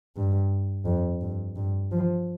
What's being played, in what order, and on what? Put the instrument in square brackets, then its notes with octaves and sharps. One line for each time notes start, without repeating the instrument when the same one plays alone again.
[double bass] G2
F2
G2
G2
F3